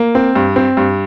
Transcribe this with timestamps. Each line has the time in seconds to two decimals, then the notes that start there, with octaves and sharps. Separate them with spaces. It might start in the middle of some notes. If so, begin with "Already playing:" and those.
Already playing: A#3
0.15 C4
0.35 G2
0.56 C4
0.77 G2